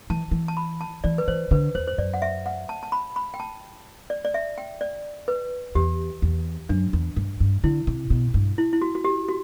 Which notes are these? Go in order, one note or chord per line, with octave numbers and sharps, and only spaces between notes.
E3 A5
E3
A5
B5
A5
E3 D5
B4
E3 C5
D3 B4
E2 C5
C5
F#2 D5
F#5
E5
F#5
A5
A5
B5
B5
G5
A5
D5
D5
E5
G5
D5
B4
E2 G4
E2
F#2 D4
E2
G2
G2
D3 E4
C3
B2
G2
E4
E4
F#4
F#4
G4
F#4